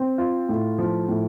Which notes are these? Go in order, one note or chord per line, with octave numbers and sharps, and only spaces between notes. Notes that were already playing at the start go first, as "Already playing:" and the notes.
Already playing: C4
F4
A2
F3
A2